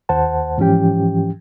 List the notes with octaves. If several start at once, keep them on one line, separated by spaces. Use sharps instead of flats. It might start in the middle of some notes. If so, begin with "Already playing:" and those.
D#2 C5 F#5 A5
G#2 E3 F3 C#4 G4 G5